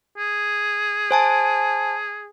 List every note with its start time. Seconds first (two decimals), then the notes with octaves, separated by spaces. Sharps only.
0.18 G#4
1.11 C5 G#5 A5